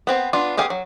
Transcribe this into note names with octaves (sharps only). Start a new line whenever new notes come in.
B3 C4 C5
B3 D4 F4
B3 G4 G#4 F5
F#3